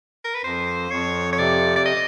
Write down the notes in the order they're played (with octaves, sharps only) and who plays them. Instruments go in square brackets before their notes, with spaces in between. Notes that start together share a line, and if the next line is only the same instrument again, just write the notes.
[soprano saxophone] A#4
B4
[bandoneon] F2 [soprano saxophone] C5
[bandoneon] F2 [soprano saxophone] C#5
[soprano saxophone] C#5
[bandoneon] C3 [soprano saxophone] D5
[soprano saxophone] D5
D#5